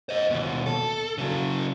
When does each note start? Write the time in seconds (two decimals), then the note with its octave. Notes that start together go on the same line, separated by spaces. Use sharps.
0.09 C5 D#5
0.30 D#2 B2
0.66 A4
1.18 C#3 F#3